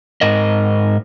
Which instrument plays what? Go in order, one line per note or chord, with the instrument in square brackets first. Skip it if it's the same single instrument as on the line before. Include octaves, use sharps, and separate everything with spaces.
[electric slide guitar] G#2 A#4 D#5